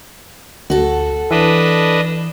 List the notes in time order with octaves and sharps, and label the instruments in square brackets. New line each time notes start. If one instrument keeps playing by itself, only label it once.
[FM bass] D2 [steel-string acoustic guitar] F#4 A4
[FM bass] E3 [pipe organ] D4 B4 D#5